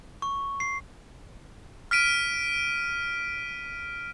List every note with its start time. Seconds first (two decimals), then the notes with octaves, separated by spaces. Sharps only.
0.22 C#6
0.60 C7
1.91 F6 B6 D7 D#7